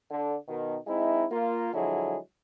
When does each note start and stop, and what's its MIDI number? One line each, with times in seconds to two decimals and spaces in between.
0.11 0.35 50
0.48 0.76 47
0.48 0.76 51
0.87 1.25 56
0.87 1.25 60
0.87 1.25 63
0.87 1.25 64
1.31 1.69 58
1.31 1.69 65
1.74 2.17 50
1.74 2.17 53
1.74 2.17 54
1.74 2.17 56
1.74 2.17 64
1.74 2.17 68